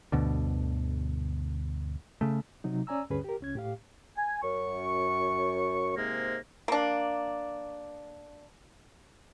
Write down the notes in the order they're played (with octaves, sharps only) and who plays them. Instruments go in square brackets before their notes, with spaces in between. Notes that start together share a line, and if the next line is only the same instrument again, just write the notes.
[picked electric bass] D2 G2 B2 D3
C#3 A3
[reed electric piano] C3 F#3 D#4
C#4 D5 G#5 A#5 E6
D2 G2 D3 C#4 G#4 B4
G4 A#4
C#2 C#4 G#6
A2 G4 F5
[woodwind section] G#5
F#2 C#6
G#2 C3 G#3 A#3
[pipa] A#3 D4